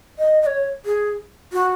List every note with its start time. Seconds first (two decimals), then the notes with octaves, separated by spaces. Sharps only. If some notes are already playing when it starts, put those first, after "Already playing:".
0.19 D#5
0.42 D#5
0.46 C#5
0.86 G#4
1.53 F#4